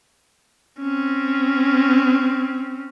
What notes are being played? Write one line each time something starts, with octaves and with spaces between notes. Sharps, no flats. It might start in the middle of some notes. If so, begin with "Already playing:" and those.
C4 C#4